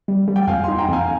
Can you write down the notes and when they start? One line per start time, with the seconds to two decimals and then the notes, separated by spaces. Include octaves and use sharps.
0.08 G3
0.28 G3
0.36 G5
0.47 F2 F5 G#5
0.64 D#4 G#5 C6
0.78 G5 A#5
0.89 F2 F5 G#5